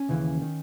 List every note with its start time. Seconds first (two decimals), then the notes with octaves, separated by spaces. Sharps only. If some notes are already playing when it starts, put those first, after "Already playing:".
Already playing: C#4
0.09 D#2 C#3 E3
0.42 D#3